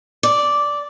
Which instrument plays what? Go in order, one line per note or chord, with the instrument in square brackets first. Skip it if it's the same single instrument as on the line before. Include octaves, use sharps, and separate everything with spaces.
[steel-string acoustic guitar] D5